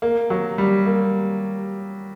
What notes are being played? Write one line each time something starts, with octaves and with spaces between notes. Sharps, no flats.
A#3
F#3
G3
A#3